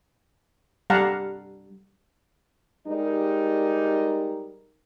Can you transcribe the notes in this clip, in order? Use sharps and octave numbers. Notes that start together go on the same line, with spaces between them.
G3 F5 F#5 A5 A#5
G3 G#3 D#4 G4 A#4 D5